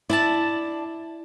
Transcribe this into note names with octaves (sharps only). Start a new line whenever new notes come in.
D4 E4 D5 A5